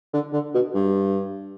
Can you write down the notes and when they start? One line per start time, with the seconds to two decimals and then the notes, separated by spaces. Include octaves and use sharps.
0.13 D3
0.33 D3
0.54 B2
0.74 G2